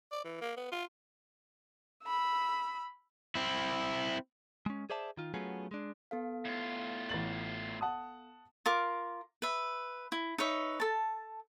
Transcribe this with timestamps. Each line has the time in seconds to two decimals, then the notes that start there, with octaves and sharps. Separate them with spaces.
0.12 D5
0.24 E3
0.41 A#3
0.57 B3
0.71 F4
2.04 B5 E6
3.35 C4 E4
4.66 G#3 C#4
4.90 G#4 C5 D5 E5 A5
5.17 D#3 F4
5.34 F#3 A3 B3 C#4 F4 G#4
5.71 G#3 D4
6.11 B3 A4 F5
6.45 A2 F4
7.09 A1 A6 F#7
7.81 F#5 A5 D#6
8.66 F4 A#4 D6
9.42 B4 E5
10.12 E4
10.38 D#4 B4 C#5 E5
10.80 A4 A5